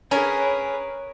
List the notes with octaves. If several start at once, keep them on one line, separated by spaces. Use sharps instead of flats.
C#4 G#4 A#4 B4 C#5